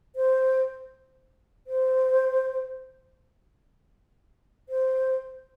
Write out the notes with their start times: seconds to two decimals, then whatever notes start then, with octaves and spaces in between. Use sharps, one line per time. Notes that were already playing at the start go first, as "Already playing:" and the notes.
0.16 C5
1.67 C5
4.69 C5